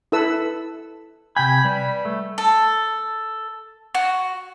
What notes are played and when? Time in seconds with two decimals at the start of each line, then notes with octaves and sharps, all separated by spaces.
0.12 E4 A4 B4 E6
1.37 C3 G5 G#5 B5
1.65 G3 B4
2.05 A3
2.38 A4
3.95 F#4